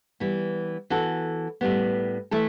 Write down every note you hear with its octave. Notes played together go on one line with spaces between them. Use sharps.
E3 G3 B3
E3 B3 F#4 A4
A2 G3 B3
E3 A3 E4 A4